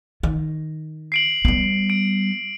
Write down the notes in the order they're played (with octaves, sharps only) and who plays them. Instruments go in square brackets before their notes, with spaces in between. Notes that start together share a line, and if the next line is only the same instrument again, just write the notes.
[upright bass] D#3
[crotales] C7 D7 F#7
[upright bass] G3 B3
[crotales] D7